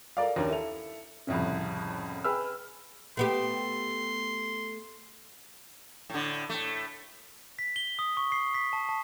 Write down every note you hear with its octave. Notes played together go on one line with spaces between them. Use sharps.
A4 A#4 D5 F5
D#2 C#4 D4 A#4
E4 A4 F7
C2 F2 A2 C#3
G#4 B4 G5 B5 E6 F6
A3 B3 G4 C6
A2 D3
A2 A3
B6
G7
D#6
C#6
C7
B6
A5
A5